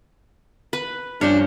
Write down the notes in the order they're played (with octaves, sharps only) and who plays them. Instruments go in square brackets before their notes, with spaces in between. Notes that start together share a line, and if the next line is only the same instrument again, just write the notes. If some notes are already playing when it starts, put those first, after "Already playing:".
[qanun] B4
[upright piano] G2 F3 C#4 [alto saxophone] D4 [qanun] C5 C#5